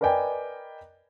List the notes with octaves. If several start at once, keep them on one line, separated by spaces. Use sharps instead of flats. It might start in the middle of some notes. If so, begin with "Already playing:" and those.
A#4 B4 D5 D#5 G5 G#5